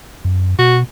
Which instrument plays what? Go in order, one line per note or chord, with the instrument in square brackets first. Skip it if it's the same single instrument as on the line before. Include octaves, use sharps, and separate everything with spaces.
[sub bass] F#2
[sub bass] B2 [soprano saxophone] F#4